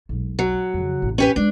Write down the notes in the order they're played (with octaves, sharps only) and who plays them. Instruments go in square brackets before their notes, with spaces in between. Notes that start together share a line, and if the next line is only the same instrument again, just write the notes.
[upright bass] E1 B1
[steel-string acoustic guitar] F#3
[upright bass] F2 C#3
A1 F2
[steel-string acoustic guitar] C#4 G4 B4
[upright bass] G#3 C4 [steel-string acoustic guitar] D4